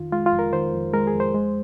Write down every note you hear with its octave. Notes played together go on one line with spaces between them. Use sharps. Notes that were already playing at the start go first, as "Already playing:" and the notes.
Already playing: F2 D#3 F4
G#3 F4
F4
F2
A#4
D#3 C5
F2
G#3 A#4
G#4
F2
C5
G#3